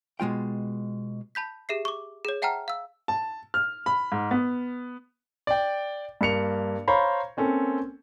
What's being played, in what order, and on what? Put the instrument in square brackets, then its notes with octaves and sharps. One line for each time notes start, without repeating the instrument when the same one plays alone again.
[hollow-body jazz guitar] B2 G#3 F4 G5
[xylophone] A5 B5 G6 B6
G4 G#4 E5 C7
C#6 D6
G#4 C#5
E5 F#5 G5 A5 A#5 F6
F5 E6
[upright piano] A5
F6
B5
G#2
B3
[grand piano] D5 G5
G2 A#3 C#7 F7
C5 C#5 F5 A#5 B5
A#3 C4 C#4 A4